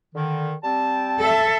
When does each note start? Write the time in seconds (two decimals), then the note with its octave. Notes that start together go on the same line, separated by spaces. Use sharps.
0.15 D3 D#3
0.64 G3 C4 A5
1.20 A4 E5